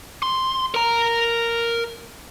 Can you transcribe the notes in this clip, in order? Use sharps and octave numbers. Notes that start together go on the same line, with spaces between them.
C6
A#4 A#5